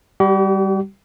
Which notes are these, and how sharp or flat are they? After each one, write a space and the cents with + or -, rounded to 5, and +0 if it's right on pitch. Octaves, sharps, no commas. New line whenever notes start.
G3 +0 G4 -45